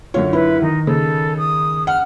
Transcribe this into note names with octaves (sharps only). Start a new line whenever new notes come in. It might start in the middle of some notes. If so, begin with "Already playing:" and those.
F#2 D3 F4 C#5
E4 B4
D#3 D#4
C#3 A4
D#6
F#5 F6